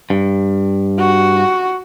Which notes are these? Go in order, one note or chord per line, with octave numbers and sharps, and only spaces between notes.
G2
F#4